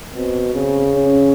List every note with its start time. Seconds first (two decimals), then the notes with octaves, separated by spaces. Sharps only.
0.14 B2 C4
0.53 C#3 C4
0.94 C#4